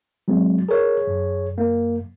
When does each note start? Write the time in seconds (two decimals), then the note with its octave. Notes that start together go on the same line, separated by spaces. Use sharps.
0.28 F#3 G#3 C4
0.68 G#4 A#4 C#5
1.07 F#2
1.58 A#3